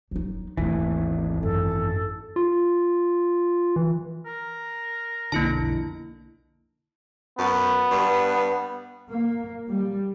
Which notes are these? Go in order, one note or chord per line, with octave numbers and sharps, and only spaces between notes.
F#3 D#4
G#1 D#2 E3 A3
F#2 A4
F4
E3
A#4
B1 F2 D3 A#3 E4 A5
F#2 B3
G2
A#3
G3